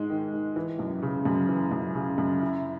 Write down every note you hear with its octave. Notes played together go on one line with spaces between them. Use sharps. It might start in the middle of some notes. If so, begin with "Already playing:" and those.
Already playing: G#2 G#3
D#3
G#2
E3
F#2
C#3
F#2
E3
F#2
C#3
F#2
E4